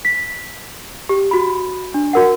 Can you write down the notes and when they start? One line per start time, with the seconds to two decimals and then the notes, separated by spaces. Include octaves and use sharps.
0.05 B6
1.09 G4
1.31 F#4 B5
1.94 D4
2.13 F#4 A#4 F#5